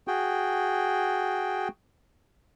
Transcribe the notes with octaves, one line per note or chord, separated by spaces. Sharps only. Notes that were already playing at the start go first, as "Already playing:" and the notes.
F#4 G#4 G5